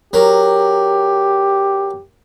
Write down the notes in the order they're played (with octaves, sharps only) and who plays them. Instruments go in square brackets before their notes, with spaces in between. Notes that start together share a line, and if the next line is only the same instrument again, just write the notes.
[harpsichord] F#3 A#4 [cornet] G4